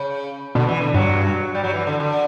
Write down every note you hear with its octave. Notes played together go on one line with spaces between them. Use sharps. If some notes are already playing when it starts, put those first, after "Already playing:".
Already playing: C#3
B2 D3
E3
D3
G2 F#3
G3
F#3
E3
D3
D3